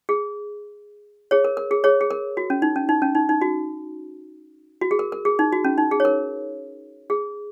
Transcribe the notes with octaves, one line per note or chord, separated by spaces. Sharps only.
G#4
G#4 C#5
A#4
A#4
G#4
G#4 C#5
G#4
A#4
F#4
C#4
D#4
C#4
D#4
C#4
D#4
D#4
F#4
F#4
G#4
A#4
A#4
G#4
D#4
F#4
C#4
D#4
G#4
C#5
A#4
G#4